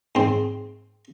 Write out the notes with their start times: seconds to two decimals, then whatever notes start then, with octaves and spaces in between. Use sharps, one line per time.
0.15 G#2 C4